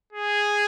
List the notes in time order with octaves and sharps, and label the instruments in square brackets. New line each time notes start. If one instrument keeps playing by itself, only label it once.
[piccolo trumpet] G#4